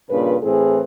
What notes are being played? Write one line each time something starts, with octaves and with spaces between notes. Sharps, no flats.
G2 A#2 C#3 B4
A2 E3 C4 E4 G#4